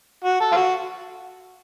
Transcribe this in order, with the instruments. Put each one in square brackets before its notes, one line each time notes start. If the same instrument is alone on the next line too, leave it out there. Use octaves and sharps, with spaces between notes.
[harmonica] F#4
A4
F4
F#4